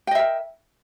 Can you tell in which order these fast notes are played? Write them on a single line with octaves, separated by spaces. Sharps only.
G5 D#5 E5 A#4